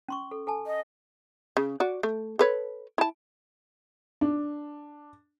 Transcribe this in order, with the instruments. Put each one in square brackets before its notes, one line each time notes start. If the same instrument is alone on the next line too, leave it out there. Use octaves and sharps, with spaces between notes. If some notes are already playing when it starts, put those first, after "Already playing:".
[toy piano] C#4 C6 C#6
A4
A4 G#5 A5
[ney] D#5
[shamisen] C#3
F#4 D5
A3
A4 B4 C#5
E4 A5
[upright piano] D4